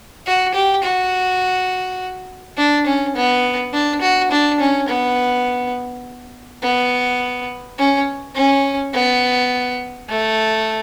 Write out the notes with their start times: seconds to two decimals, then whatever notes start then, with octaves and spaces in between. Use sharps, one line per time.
0.26 F#4
0.54 G4
0.84 F#4
2.58 D4
2.86 C#4
3.16 B3
3.73 D4
4.01 F#4
4.32 D4
4.60 C#4
4.89 B3
6.63 B3
7.79 C#4
8.35 C#4
8.93 B3
10.10 A3